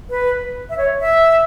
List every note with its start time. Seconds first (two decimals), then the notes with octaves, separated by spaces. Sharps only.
0.10 B4
0.70 E5
0.78 C#5
1.01 E5